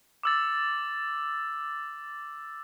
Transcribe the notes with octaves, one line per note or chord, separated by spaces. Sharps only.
D6 E6 A6